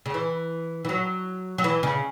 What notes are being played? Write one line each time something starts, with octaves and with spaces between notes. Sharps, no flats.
C#3
E3
E3
F#3
F#3
E3
C#3